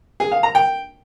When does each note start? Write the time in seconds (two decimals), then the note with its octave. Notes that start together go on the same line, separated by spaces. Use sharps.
0.20 G#4
0.32 F5
0.43 A#5
0.55 G5